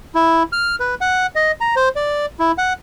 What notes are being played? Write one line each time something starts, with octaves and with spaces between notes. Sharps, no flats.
E4
F6
B4
F#5
D#5
A#5
C5
D5
E4
F#5